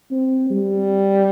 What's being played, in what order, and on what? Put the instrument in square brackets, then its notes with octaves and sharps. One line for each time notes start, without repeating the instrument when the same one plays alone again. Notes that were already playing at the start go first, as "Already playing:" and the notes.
[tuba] C4
G3